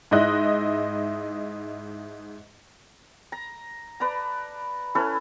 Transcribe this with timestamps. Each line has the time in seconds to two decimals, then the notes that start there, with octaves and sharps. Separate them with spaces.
0.11 G#2 E4 D#5 F#6
3.32 A#5
4.00 B4 D5 A5 A#5
4.95 C#4 E4 A4 B4